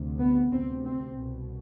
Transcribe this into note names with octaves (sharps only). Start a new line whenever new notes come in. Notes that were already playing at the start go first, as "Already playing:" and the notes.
Already playing: D2 C3
B3
D2 C3 C4
C4
C2 B2